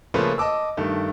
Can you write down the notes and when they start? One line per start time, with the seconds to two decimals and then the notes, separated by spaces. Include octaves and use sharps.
0.14 C#3 F3 A3 A#3 F4 B4
0.38 D#5 A5 D6 E6
0.77 G2 D#3 A3